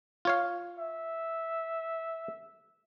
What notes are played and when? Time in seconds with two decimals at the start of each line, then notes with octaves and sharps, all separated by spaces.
0.25 F4 C#5 F5
0.79 E5